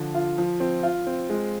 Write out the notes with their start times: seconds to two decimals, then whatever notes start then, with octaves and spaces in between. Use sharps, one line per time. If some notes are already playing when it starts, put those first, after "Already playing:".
Already playing: D3 F3
0.15 F4
0.38 F3
0.60 C4
0.83 F4
1.07 C4
1.30 G#3